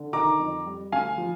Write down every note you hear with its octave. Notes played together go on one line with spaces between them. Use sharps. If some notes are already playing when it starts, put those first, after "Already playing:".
Already playing: D3
D#3 A#5 D6
F2
G3
D2 F5 G#5
F3